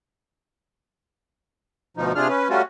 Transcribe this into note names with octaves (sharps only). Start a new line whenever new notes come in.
D2 B2 F3 D#4
C3 D4 F4 G#4 F6
C#4 B4
G3 A3 C#4 F4 F#4